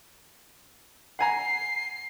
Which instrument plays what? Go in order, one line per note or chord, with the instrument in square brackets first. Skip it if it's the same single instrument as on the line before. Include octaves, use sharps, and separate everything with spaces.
[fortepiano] F#5 G#5 A#5 [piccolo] C7